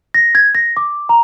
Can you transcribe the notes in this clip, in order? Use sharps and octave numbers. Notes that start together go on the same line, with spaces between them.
A#6
G#6
A#6
D6
A#5